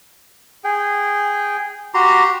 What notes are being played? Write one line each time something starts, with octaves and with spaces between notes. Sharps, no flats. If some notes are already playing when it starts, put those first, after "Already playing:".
G#4 G5
F#4 G4 A#5 C6